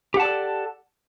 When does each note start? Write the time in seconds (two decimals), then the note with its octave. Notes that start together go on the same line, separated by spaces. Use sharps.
0.14 G4
0.17 F#5
0.20 A5
0.22 D5
0.25 A4